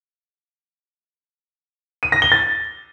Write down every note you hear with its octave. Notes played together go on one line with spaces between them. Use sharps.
D#7
A#6
G7
A6